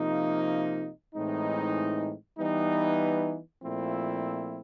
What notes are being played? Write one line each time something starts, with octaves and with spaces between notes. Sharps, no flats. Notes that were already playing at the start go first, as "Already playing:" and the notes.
Already playing: C3 F3 A#3 D#4
A2 E3 G#3 C4 D#4
E3 G3 B3 D#4
A#2 F3 A3 C4 E4